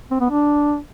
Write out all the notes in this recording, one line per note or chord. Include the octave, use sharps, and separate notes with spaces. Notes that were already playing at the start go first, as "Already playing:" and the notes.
C4
B3
D4